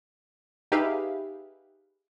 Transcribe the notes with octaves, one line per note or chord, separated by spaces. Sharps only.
D#4 G4 G#4 B4 E5 F5